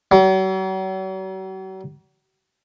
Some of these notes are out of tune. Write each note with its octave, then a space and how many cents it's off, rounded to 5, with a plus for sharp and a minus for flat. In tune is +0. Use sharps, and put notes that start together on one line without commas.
F#3 +45